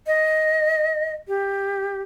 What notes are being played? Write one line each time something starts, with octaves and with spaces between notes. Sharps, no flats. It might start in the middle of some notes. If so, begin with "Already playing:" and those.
D#5
G4